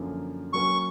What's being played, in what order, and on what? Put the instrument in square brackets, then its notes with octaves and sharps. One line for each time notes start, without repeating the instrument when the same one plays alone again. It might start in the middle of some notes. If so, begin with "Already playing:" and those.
Already playing: [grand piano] F#2 D3 F3 A#3
[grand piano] F#3 A#3 C#4 [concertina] C#6